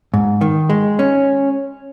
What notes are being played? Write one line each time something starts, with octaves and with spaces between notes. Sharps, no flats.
G#2
D#3
G#3
C#4